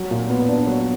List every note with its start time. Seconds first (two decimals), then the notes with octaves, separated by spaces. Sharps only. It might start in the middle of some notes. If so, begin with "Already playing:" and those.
Already playing: F#3
0.11 A#2
0.30 B3
0.48 D4
0.67 F#3